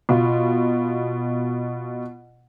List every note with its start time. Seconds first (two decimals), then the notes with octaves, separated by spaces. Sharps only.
0.09 B2 F4